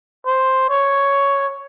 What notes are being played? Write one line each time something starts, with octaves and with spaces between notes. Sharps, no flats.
C5
C#5